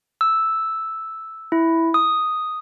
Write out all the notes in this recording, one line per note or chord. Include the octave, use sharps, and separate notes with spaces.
E6
E4
D#6